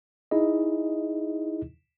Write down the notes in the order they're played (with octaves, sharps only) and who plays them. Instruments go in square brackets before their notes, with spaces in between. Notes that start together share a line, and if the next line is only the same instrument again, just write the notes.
[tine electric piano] D#4 E4 G#4 D#5